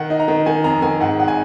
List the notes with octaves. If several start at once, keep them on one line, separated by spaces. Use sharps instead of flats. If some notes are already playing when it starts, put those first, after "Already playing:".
Already playing: D#3 F#5
D#4
A#5
D#3
D#3 G#5
F2 A#5
D#3 G#5
G#2 F#5
G#1 F#5
G#5